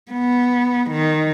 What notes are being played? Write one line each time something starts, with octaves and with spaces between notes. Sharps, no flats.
B3
D#3